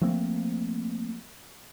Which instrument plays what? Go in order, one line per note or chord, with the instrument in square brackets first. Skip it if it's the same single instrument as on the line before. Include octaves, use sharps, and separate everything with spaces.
[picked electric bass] F3 A3 A#3 C4